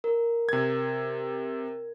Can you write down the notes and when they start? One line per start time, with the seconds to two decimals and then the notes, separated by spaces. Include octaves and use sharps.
0.04 A#4
0.49 C3 G#6